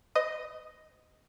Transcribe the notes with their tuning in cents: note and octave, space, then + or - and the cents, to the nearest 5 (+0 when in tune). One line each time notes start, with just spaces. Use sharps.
B4 +40 D#5 +0